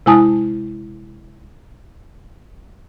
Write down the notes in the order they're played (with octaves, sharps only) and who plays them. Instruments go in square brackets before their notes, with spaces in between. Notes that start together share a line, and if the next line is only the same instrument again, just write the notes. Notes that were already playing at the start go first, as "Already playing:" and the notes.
[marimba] C3 G#3 E4 G#5 A5 D#6